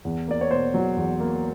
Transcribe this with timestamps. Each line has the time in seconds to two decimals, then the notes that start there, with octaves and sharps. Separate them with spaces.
0.05 E2
0.28 A#3 D5
0.41 C#5
0.51 B2 C5
0.74 F#3
0.97 E2
1.20 A#3